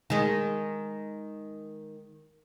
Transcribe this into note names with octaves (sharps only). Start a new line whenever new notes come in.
D#3 G#3